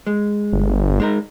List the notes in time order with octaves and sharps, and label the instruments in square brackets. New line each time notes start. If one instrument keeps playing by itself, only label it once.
[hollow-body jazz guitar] G#3
[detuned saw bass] G1
[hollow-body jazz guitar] G#3 D#4 A#4